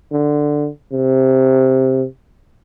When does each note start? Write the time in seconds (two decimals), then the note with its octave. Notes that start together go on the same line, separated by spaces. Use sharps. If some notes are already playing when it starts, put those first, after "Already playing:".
0.12 D3
0.92 C3